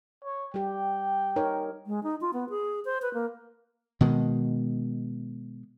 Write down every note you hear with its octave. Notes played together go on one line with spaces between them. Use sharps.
C#5
G3 G4 G5
D#4 A#4 C#5
G#3
D#4
F4
B3
G#4
C5
B4
A#3
B2 D#3 G#3